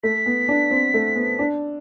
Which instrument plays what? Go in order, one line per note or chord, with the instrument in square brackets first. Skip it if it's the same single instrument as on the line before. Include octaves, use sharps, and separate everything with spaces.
[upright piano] A3 [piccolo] B6
[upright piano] B3
D4
C4
A3
B3
D4